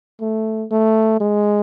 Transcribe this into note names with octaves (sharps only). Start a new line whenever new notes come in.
A3
A3
G#3